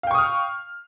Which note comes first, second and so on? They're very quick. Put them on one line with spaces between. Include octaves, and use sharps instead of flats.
F5 G5 C#6 D#6 F6